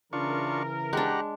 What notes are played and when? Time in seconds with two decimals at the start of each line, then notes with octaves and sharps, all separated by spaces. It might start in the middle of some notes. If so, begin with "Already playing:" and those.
0.13 C#3 E3 D4 F4 A#4 C#6
0.93 G#3 D4 G4 F#5 A#5